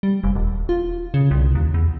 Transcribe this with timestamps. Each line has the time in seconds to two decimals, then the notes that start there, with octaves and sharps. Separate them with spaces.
0.03 G3
0.24 F1
0.35 D#1
0.69 F4
1.14 C#3
1.31 C2
1.55 D#2
1.74 E2